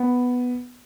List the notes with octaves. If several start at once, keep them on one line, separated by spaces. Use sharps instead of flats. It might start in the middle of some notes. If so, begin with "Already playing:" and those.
Already playing: B3